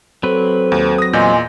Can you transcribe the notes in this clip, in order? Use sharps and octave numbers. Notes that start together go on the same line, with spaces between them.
F#3 C4 A4 B4 C5
D#2
D#6 A#6
E2 A#2 D#5 G#5 C6 G6